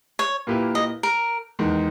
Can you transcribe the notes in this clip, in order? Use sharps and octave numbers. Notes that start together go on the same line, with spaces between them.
C#5
A#2 A#3 E4 G4 B4
D#5
A#4
E2 D#3 G#3